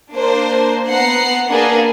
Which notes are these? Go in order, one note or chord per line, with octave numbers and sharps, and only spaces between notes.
A#3 D4 C5
B3 F#5 A#5 C7
A#3 D4 G#4 B4